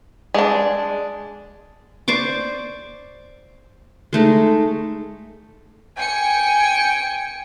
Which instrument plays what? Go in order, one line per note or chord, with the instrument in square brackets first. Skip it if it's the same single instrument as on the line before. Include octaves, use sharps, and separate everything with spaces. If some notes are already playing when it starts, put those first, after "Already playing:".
[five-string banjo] G#3 D4
[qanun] C5 D5 C#6 D6
G#3 A3 D#4
[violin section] G5 G#5 C#7